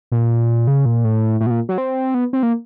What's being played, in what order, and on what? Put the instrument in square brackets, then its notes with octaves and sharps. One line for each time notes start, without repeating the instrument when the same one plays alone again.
[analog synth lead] A#2
C#3
A#2
A2
A2
B2
A#2
F#3
C4
B3
C4
A#3